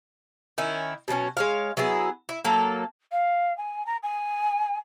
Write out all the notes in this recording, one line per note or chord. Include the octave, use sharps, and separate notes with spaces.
D#3 C#4 E4
B2 F#3 A3 C#4
G#3 C#5 F5
F#3 B3 E4 G#4
E4
F#3 A#3 A4
F5
G#5
A#5
G#5